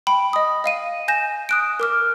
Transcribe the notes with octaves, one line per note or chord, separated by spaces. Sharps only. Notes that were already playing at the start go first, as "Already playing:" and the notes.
G5 B5
D#5 D#6
D#5 F5 D#7
G#5 G6 A#6 E7
D#6 F#6 D7
A#4 D6 F6